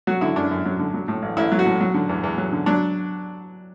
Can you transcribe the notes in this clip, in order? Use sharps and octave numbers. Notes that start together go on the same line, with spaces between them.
F#3 F#4
D3 E4
F#2 D4
F#2
F#3
D3
F#3
A2
A1
A1 E4
F#3
F#4
A2
F#3
D3
E2
E2
F#3
D3
F#3 D4